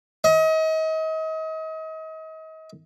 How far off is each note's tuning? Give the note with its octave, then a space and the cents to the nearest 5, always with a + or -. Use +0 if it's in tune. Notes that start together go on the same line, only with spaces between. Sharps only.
D#5 +35